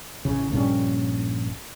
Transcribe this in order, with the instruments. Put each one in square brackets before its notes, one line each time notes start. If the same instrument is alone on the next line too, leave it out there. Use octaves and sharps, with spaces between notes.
[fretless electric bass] A1 C#3
A#1 G2 E3 C#4